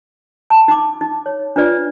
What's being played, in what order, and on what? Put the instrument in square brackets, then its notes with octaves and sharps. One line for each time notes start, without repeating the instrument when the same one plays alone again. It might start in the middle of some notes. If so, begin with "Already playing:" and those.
[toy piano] A5
D#4 B5 D6
D#4
C#5
D4 F4 B4 D5